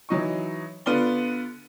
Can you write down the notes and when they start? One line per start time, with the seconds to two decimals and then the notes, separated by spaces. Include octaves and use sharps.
0.09 E3 F#3 D#4 C#6
0.86 D3 B3 F4 D5 G7